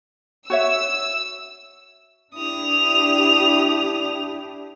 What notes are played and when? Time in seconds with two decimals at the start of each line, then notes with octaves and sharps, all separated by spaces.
0.50 F#4 C#5 E5 E6
2.35 D4 E4 G4 D#6 F7